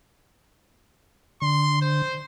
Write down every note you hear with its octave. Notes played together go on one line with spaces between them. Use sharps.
D3 C6
C5